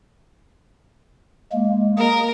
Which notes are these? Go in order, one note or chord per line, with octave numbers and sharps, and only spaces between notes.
G#3 A#3
A#3 G#4 A#4